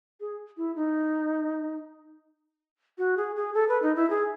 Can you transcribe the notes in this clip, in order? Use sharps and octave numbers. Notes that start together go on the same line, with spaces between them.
G#4
E4
D#4
F#4
G#4
G#4
A4
B4
D#4
E4
G#4